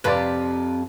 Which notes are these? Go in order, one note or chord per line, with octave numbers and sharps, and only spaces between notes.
F2 C3 B4 D5